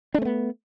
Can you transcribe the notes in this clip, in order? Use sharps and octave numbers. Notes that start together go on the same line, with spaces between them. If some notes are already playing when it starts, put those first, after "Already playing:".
A3 B3 C4 D4